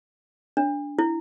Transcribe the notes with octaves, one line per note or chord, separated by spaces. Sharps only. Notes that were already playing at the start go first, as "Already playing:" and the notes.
D4
E4